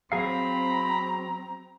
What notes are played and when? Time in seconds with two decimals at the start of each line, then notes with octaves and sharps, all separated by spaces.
0.12 F#3 C4 G#4 F5 A#5 B5